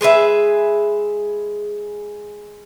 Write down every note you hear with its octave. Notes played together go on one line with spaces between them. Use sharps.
G#3 G#4 B4 E5